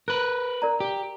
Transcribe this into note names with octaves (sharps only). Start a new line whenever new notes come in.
A#4 B4 F#6
A#4 D5 A#5
G4